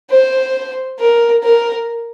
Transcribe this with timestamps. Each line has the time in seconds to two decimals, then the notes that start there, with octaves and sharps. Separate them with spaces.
0.11 C5
0.99 A#4
1.43 A#4